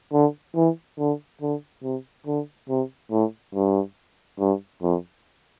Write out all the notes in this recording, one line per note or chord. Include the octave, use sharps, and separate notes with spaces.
D3
E3
D3
D3
C3
D3
C3
A2
G2
G2
F2